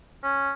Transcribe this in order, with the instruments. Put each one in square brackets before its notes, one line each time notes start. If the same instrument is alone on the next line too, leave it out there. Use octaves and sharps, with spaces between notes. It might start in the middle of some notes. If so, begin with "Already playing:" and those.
[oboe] C#4